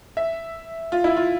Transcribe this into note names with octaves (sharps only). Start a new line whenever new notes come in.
E5
F4
E4
F4